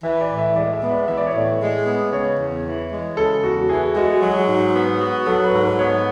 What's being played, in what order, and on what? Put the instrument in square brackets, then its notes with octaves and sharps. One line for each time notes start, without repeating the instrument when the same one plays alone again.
[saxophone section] E3 [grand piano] E5
[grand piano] D5
[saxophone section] A2
[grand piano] E5
[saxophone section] G#3 [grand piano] D5
[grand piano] E5
[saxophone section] B3
[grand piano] D5
[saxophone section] E3 [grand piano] E5
[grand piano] D5
C#5
[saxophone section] A2 [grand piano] D5
[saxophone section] G#3
B3
[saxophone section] C#3 [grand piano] C#5
[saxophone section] E2
E3
G#3
[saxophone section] C#3 [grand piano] A4
[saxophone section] E2 [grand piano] F#4
[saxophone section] E3 [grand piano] G#4
[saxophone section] G#3 [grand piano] F#4
[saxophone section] F#3 [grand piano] G#4
[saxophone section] G#2
B3
F#4
[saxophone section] F#3 [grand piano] A4
[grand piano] B4
[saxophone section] G#2
[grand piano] B4
[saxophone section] B3 [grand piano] C#5